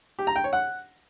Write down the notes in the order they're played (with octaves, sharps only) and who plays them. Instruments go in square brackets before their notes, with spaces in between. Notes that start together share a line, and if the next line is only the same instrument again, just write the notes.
[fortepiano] G4
A#5
G5
C#5
F#5